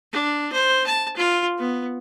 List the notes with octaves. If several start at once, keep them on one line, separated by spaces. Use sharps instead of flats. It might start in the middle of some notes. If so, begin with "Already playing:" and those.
D4
C5
A5
F4
B3